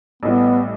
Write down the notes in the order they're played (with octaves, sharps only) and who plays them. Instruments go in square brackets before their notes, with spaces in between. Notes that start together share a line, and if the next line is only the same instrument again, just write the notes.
[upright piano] A1 A2 G3 [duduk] B3